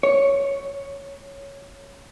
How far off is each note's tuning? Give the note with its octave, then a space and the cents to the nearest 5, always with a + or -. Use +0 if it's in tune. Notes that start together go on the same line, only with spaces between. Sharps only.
C#5 +0